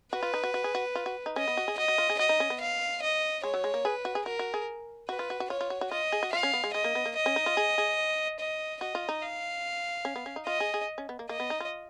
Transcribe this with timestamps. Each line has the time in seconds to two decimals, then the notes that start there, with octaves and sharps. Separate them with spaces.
0.13 F#4 B4
0.23 F4
0.34 D#4
0.44 F#4
0.54 F#4
0.64 G#4
0.75 F#4
0.95 F4
1.06 F#4
1.26 D#4
1.36 C#4 D#5
1.48 B3
1.57 F#4
1.68 G#4
1.78 F#4 D#5
1.88 F#4
1.98 F4
2.10 G#4
2.19 F#4 D#5
2.29 D#4
2.40 C#4
2.50 B3
2.61 F5
3.02 D#5
3.43 G#3 C#5
3.54 F#3
3.64 G#3
3.74 A#3
3.85 G#4 B4
4.05 F#4
4.15 G#4
4.26 F#4 A#4
4.39 F#4
4.54 G#4
5.09 F#4 B4
5.19 F4
5.30 F#4
5.40 F#4
5.50 F4 C#5
5.61 F4
5.70 F#4
5.81 F#4
5.91 F4 D#5
6.12 G#4
6.23 F#4
6.32 F4 F5
6.43 C#4
6.53 B3
6.64 G#3
6.74 G#3 D#5
6.84 A#3
6.95 B3
7.05 A#3
7.16 D#5
7.26 C#4
7.36 D#4
7.46 F4
7.57 G#4
7.78 G#4
8.40 D#5
8.81 F#4 D#5
8.95 F4
9.09 D#4
9.22 F5
10.05 C#4
10.16 B3
10.26 C#4
10.36 D#4
10.46 F4 D#5
10.60 G#4
10.74 G#4
10.98 C#4
11.09 B3
11.19 A#3
11.29 A#3 D#5
11.40 B3
11.50 D#4
11.60 F4